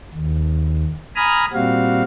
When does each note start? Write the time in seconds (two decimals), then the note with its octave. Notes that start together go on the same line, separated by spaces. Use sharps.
0.13 D#2
1.16 G#5 A#5 B5 D#6 F6
1.53 A#2 G3 C4 F#4 F5